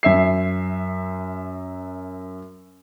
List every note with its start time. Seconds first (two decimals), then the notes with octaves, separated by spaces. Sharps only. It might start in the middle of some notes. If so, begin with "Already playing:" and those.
0.03 F#2 E5 C7